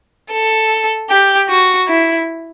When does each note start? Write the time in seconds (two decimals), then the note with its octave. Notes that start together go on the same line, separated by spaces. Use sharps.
0.32 A4
1.10 G4
1.49 F#4
1.88 E4